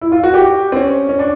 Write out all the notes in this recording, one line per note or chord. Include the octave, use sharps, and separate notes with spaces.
E4
F4
F#4
G4
C4
C#4
C#4
D4